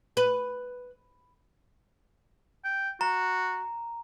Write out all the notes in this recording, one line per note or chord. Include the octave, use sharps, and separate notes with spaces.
B4
G5
F#4 A#5